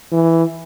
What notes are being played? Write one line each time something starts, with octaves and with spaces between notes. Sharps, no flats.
E3